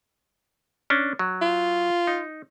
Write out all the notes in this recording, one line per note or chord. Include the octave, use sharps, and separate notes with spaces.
C#4 D4
F#3
F4
D#4